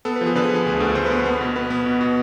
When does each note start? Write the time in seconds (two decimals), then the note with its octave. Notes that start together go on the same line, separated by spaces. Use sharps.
0.05 B3 A4
0.16 B4
0.21 F3
0.26 G#4
0.35 D3 B4
0.50 F3
0.55 G#4
0.66 D2 G#4
0.80 D2 A4
0.95 D2 C5
1.06 B4
1.11 B3
1.26 B3
1.41 B2
1.56 B3 B4
1.70 B3
1.86 B2
2.01 B2